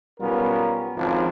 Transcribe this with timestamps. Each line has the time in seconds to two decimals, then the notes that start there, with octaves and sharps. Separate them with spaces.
0.20 B1 G3 B3 C#4 F4 A#4
0.96 G#1 F2 C#3 F3